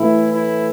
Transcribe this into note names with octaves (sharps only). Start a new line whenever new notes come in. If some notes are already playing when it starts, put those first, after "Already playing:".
Already playing: A2 E3 A3 E4
E4